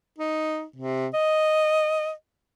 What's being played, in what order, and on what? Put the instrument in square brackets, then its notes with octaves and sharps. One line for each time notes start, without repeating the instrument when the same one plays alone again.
[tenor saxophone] D#4
C3
D#5